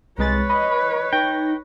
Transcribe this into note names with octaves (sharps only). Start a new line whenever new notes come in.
C2 G#3 B4 C#5 A6
D#5 B5
D#4 G5 A#6